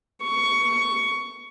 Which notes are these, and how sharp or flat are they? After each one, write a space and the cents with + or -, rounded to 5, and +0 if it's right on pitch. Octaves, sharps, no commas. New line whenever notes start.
C#6 +15